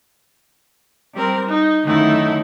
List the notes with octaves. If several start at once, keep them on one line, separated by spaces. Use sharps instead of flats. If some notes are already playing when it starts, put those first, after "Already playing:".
G3 C4 A#4
D#4
F#2 D3 D#3 A3 D#4 E4